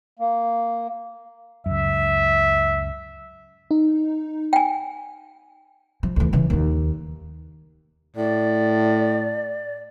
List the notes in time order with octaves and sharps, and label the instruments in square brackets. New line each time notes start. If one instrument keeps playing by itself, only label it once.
[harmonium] A#3
[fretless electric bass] C#2 F#2 [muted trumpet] E5
[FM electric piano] D#4
[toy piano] G5 G#5
[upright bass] F3
D2 E3
C#3 E3
D#2 D#3
[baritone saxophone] A2 [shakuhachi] D5